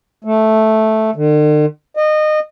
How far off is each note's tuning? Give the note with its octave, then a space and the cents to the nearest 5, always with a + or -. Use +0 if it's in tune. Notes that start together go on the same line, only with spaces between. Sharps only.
A3 -5
D3 +45
D#5 -25